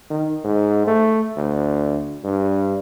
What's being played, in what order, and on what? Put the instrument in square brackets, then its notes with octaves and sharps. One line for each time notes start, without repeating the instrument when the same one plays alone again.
[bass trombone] D#3
G#2
A3
D2
G2